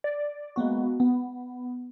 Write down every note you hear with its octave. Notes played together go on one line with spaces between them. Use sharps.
D5
G#3 A#3 B3 F#4
B3